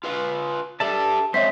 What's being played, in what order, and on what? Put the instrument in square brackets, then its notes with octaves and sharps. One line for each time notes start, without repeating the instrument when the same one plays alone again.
[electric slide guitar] F4 B4 F5
[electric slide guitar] D4 G4 D5 [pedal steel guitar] A4 E5 A5
[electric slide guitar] G#3 C4 F5 [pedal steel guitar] C5 [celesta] C#5 E5 B6